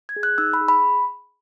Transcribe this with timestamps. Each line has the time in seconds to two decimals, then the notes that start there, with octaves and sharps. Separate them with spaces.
0.09 G#6
0.16 G#4
0.23 F#6
0.38 D#4 E6
0.54 B5
0.61 G#4
0.68 B5